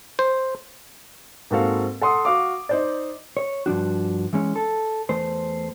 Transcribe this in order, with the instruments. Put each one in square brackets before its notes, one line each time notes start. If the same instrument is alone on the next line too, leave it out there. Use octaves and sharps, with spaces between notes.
[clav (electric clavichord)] C5
[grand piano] G#2 A#3 C4 F#4 A4 F5
A4 F#5 C6 D#6
F#4 F5 D6
D#4 C5 D5
[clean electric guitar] C#5
G2 F3 D4 F#4
E3 G#3 C#4
A4
E2 A3 C5